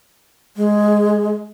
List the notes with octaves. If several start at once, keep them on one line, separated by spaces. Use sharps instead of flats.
G#3